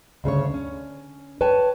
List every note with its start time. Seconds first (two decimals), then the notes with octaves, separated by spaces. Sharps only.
0.24 D2 C#3 A4 C#5
0.54 C#4
1.41 B4 C#5 G5 A5